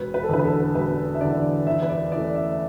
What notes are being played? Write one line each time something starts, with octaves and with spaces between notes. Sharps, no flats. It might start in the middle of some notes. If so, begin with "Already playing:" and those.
Already playing: E1 B4
B4
A4
E2 D3 B4
B4
A4
E1 B4
E5
E2 D3 D5
E2 E5
B4
D5
E3 A3 D5
E5